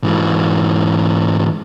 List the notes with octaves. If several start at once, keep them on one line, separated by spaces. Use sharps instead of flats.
G#2 E3